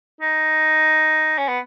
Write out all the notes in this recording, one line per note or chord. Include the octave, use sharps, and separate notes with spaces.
D#4
C#4
B3